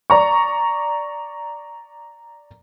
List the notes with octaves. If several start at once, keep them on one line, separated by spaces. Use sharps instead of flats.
D5 A#5 C#6